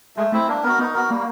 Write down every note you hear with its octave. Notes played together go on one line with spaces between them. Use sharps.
G#3 A3
A3 C4 E4
A#3 D4
B3 F#4 A#4
B3 D#4
B3 F#4 A#4
G3 A#3